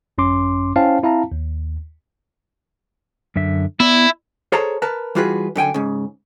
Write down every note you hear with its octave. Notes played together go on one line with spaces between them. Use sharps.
G#1 F#2 C#4 C6 D6
C#4 E4 C5 F5 G5 A5
C4 E4 F5 A5 A#5
D#2
F#2 D3 E5
B3 E4 D5
G#4 A4 C5 C#5 A5 A#5
A#4 B4 A5
E3 G3 F4 F#4 G#4 B4
F#2 D3 G5 G#5
G#2 C#3